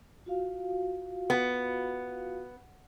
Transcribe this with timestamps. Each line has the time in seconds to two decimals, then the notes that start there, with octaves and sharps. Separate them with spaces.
0.26 F4 F#4 F5
1.30 B3